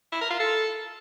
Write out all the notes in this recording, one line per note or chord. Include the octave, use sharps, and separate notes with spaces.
E4
A#4
F4
A4